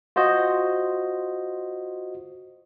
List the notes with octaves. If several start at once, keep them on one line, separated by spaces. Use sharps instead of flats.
F4 F#4 C5 D#5